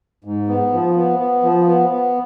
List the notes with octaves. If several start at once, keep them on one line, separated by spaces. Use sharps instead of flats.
G#2
B3
F3
B3
B3
F3
B3
B3